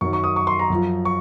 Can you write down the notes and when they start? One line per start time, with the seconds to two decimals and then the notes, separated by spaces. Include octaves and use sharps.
0.01 F#2 D#3 F#3 C#6
0.13 C#6
0.24 D#6
0.36 C#6
0.47 C6
0.59 A#5
0.70 F#2 F3
1.05 C#6